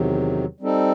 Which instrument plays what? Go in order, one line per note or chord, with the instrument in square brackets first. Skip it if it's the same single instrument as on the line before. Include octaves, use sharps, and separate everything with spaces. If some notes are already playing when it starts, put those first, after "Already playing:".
Already playing: [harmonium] E2 C3 D#3 F#3
G3 C4 D#4 A4